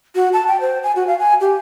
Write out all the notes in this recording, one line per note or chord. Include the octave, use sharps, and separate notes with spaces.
F#4
A5
G5
C5
G#5
F#4
F5
G#5
G4